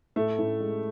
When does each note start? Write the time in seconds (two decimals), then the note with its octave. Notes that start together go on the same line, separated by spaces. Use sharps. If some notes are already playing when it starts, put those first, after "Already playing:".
0.16 A2 A3
0.38 A2
0.60 G#3